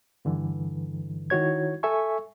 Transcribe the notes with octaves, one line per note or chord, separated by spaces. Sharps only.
G2 D3 E3
D#3 E4 F#4 C#5 G#6
A4 E5 G#5 C#6